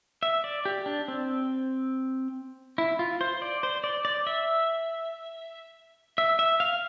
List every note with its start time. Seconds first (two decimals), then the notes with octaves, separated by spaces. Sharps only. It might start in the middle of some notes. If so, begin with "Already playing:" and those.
0.23 E5
0.44 D5
0.65 G4
0.86 D4
1.08 C4
2.78 E4
2.99 F4
3.21 C5
3.42 D5
3.63 C5
3.84 D5
4.05 D5
4.27 E5
6.18 E5
6.39 E5
6.60 F5